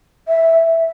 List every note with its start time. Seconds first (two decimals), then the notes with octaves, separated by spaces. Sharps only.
0.28 E5